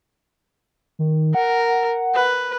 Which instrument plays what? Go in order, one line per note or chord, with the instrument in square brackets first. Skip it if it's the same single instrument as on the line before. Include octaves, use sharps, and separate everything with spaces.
[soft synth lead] D#3
[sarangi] A#4 [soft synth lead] F#5
[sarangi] B4